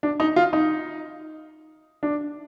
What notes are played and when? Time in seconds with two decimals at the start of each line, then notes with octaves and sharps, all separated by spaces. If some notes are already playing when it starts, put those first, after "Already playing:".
0.03 D4
0.20 D#4
0.36 F4
0.53 D#4
2.03 D4